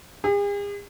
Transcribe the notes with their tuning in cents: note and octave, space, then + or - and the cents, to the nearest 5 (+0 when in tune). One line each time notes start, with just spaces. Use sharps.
G#4 -45